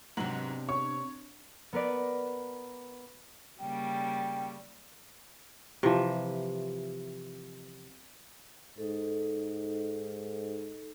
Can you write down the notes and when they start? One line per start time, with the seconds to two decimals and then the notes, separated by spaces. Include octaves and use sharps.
0.17 G#2 C3 F#3 B3 D4 F#7
0.69 C#5 C#6
1.73 B3 A#4 B4 D5
3.61 C#3 G3 A#3 G5
5.83 C3 E3 F3
8.78 G#2 D#4 A4